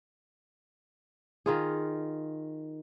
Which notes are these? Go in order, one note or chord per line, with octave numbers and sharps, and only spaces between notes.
D#3 F4 G#4